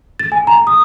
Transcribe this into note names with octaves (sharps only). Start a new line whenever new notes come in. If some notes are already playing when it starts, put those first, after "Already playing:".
A6
G#5
A#5
D#6